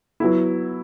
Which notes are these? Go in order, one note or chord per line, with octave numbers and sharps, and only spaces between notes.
F#3 B3 E4